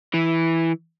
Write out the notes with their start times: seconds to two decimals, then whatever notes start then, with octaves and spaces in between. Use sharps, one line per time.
0.14 E3